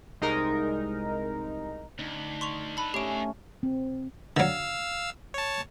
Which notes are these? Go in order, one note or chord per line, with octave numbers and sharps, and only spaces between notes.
C2 G#3 D#4 A#4 A#5
D2 D4 D#4
C6 C#6 F7
A4 B4 A5 B5
A3 C#4 G4 G#4 E5 D7
C4
D3 F#3 F5 E6
C#5 A5